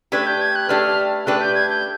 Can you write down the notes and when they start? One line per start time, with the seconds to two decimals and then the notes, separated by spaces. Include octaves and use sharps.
0.12 A3 D4 G4 B4 G#6
0.27 G6
0.41 G#6
0.56 F#6
0.69 A3 D4 G4 B4 F6
1.26 A3 D4 G4 B4 F#6
1.41 G6
1.55 G#6
1.69 G6